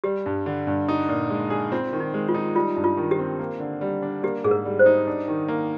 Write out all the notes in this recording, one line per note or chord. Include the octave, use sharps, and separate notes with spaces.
G3 G4
G2
D3
G2
D#4
A#2
G#3
G#4
C4 F4
D#3
D#4
G#3
F4
D#4
G3 F4
G2
F4
D#3
G4
C4
A#3
D3
G3
D4
A#3 G4
G#2 G#4
A#4
G3
C5
D#4
D4
D#3
A#3